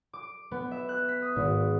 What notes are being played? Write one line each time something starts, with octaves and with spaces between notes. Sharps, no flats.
D6
B3
E5
F#6
B6
D#6
G#1